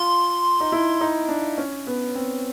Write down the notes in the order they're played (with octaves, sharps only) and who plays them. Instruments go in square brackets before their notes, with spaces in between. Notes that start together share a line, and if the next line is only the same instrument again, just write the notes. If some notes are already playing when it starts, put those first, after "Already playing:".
Already playing: [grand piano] F4 [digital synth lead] C6
[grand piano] D#4
E4
D#4
D4
C#4
B3
C4